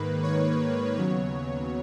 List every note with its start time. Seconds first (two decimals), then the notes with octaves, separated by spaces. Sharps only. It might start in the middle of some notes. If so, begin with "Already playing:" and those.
Already playing: G#2 D#3 A#3 B4
0.23 C#5
0.97 D#2 C#3 F#3 B3 C#5